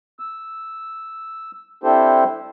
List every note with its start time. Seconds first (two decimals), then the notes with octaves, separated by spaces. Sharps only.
0.19 E6
1.84 C4 D4 E4 G4 A4 C5